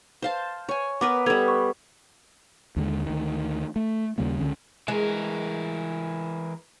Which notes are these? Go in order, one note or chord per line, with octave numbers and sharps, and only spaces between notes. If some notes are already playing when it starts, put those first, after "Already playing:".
C5 F5 A5
C#5 G#5
B3 A#4 B4 D6
G3 B3 A4 G#6 F7
B4 C#6
D#2 D3 G#3
D2 D#3
A3
D#2 C#3 G3 A#3
C#2 D3 C#4
E3 G#3 A#4